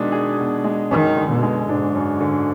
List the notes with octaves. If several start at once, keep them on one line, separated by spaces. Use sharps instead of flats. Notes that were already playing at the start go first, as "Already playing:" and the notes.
Already playing: B2 D#3 G#3 D4
G#4
B2
G#3
F#2 D#3
D3
B2
G#3
G#2 D4
F#2
D3